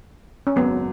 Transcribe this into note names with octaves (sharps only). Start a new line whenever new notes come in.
C#4
G#1 F#2 C#3 F#3 B3